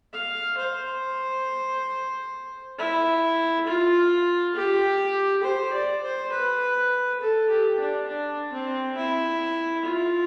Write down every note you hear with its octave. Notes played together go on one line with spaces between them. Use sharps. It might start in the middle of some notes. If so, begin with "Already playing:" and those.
F5
C5
E4
F4
G4
C5
D5
C5
B4
A4
G4
D4
D4
C4
E4
F4